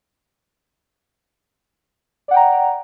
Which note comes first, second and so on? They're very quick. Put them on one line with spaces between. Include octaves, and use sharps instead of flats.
D5 F#5 G5 A#5